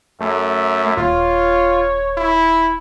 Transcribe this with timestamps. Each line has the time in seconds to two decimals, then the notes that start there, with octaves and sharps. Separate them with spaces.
0.21 F#2 A3 E5
0.97 D#1 F4 C#5
2.17 E4